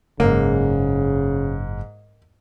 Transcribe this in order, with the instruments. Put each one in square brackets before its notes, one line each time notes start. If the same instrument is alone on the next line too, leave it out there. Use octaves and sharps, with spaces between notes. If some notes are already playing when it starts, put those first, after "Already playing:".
[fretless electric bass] F#1 [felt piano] G#2 [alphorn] C#3 [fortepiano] A#3